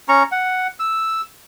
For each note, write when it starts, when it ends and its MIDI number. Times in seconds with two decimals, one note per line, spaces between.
0.09 0.23 61
0.09 0.23 82
0.09 0.23 85
0.32 0.67 78
0.80 1.21 88